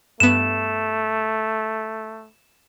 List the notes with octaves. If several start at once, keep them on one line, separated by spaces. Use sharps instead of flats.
G2 A3 B3 E7